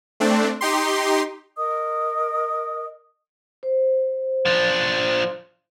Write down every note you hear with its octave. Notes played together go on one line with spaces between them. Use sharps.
A3 C4 D4
D#4 G4 C6
A#4 D#5 D#6
C5
F3 D4